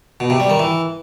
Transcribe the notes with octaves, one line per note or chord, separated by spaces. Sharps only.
B2
C3
G3
D#3
E3